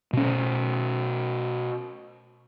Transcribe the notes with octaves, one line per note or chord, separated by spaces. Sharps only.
B2 C#4